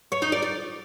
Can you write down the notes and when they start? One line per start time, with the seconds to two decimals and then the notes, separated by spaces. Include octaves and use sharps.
0.12 C#5
0.22 D#4
0.32 D5
0.42 D5